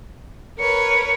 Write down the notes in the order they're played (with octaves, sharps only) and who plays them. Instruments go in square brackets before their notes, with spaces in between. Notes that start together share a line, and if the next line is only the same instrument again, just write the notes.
[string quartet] A#4 B4 C#5 [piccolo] C#7